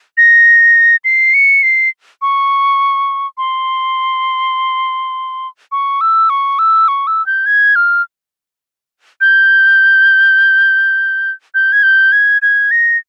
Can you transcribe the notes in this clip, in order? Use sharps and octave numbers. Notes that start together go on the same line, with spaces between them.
A#6
C7
C#7
C7
C#6
C6
C#6
E6
C#6
E6
C#6
E6
G6
G#6
F6
G6
G6
G#6
G6
G#6
G#6
A#6